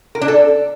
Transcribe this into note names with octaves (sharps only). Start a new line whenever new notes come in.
A#4
D4
A4